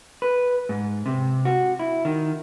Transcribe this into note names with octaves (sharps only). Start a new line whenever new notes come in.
B4
G#2
C3
F#4
E4
D#3